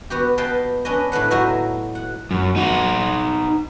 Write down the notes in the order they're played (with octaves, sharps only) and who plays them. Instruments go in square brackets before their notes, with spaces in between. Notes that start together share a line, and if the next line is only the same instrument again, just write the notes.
[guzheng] B3 F#4 G4
B4 D#5 F5 G5 A5
C#4 D4 B4 D#5
A2 D3 B4 F#5
F#3 D#4 F#4 D#5 E5
F#5
[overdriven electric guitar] F#2
D#4 F#4